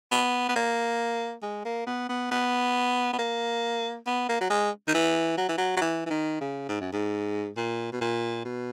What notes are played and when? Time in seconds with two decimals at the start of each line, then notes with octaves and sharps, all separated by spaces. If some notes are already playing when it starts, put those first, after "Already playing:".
0.12 B3
0.48 B3
0.56 A#3
1.42 G#3
1.65 A#3
1.86 B3
2.09 B3
2.31 B3
3.13 B3
3.18 A#3
4.07 B3
4.29 A#3
4.41 F#3
4.50 G#3
4.87 D#3
4.94 E3
5.37 F#3
5.48 E3
5.58 F#3
5.76 F#3
5.81 E3
6.06 E3
6.10 D#3
6.41 C#3
6.69 G#2
6.81 F#2
6.92 G#2
7.57 A#2
7.92 B2
8.01 A#2
8.45 B2